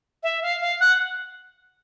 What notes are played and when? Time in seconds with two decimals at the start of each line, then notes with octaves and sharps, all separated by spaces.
0.23 E5
0.42 F5
0.61 F5
0.80 F#5